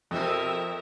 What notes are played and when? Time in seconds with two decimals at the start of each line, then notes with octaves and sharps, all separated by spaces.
0.11 F2 B2 C4 D#4 A#4 E5